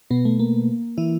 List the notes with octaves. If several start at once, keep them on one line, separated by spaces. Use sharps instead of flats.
B2 B3
A3
A#3
E3 E4